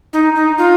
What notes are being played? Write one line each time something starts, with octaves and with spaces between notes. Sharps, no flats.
D#4
D#4
F4